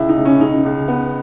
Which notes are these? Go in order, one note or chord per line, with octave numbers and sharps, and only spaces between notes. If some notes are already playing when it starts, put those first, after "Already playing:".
Already playing: C#2 E4
D#4
C#2
C#4
C#2 D#4
C#2
B3